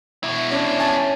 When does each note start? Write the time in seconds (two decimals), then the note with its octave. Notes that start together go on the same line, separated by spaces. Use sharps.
0.24 B2 E4
0.51 C#4 D4
0.79 C#4 G#5 A5